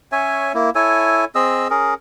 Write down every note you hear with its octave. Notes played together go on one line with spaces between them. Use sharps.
C#4 C#5 E5 G#5
A#3 E4
E4 A4 C#5 G#5
C4 G#4 D#5 E6
C#4 G#4 A#4